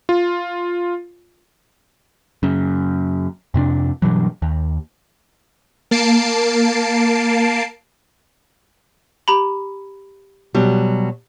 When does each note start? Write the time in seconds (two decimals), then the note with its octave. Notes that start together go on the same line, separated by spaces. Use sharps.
0.09 F4
2.43 F#2 C#3
3.54 F2 C3 B3 D4
4.02 G2 B2 E3 F#3
4.42 D#2
5.91 A#3 A5 C7 D7
9.28 G4 A#5 B5
10.54 B2 F#3 G3